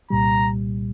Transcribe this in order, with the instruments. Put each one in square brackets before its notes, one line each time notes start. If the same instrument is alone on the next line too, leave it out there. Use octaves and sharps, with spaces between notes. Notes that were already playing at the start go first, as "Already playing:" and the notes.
[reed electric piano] C2 A#2 G3 [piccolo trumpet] A#5